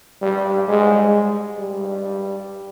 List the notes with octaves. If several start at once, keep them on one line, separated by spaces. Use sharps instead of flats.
G3
G#3
G3